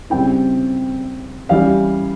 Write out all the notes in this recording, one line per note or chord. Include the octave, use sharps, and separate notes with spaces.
C#3 G3 C4 E4 G5
E3 G3 C#4 E4 F5